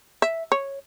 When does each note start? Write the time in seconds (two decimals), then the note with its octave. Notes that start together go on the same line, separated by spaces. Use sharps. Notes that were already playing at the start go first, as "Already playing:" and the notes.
0.22 E5
0.52 C#5